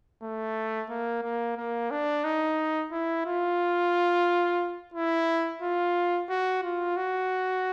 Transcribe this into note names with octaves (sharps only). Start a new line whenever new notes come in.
A3
A#3
A#3
A#3
D4
D#4
E4
F4
E4
F4
F#4
F4
F#4